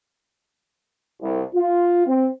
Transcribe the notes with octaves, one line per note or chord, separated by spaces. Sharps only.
C2
F4
C4